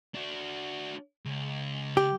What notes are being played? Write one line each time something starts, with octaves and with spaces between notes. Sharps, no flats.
D4 F#4
C#2
G4